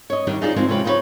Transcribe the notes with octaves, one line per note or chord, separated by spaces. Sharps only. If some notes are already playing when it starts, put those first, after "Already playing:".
C#5 D#5
D#3 F#3 G3 A#3 D4 D#4
D#4 F4 G#4 C5 D5
F3 G#3 A#3 C4 D#4
C3 C#4 F4 B4 G5
F3 D#4 F4 G4 B4 C#5